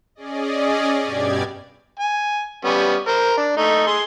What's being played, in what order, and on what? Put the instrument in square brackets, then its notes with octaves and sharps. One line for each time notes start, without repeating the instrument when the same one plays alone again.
[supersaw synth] C#4 G#4 D5 D#5
G2 B2 G4 D5 G#6
[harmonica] G#5
G3 B3 C#4
A#4 C5
D4
A3 D#4
G#4 C6